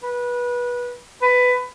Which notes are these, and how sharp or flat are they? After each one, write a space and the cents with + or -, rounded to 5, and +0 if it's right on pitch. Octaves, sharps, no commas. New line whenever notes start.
B4 -20
B4 +15